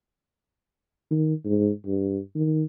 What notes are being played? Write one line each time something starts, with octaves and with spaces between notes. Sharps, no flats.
D#3
G#2
G2
D#3